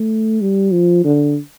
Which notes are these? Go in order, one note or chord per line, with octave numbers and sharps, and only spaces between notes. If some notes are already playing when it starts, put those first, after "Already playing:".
Already playing: A3
G3
F3
D3